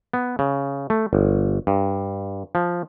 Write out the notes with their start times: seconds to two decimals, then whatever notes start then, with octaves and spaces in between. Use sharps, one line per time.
0.14 B3
0.39 C#3
0.90 A3
1.13 G1
1.67 G2
2.55 F3